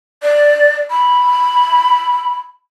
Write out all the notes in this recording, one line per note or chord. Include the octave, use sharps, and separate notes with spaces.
D5
B5